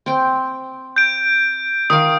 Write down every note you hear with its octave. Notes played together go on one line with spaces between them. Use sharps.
C4 G5
G6 D7
D#3 F5 D#6